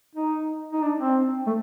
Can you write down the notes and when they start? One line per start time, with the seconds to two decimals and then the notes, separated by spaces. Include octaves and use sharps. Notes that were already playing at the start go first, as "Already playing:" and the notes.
0.15 D#4
0.73 D#4
0.83 D4
1.01 C4
1.47 A3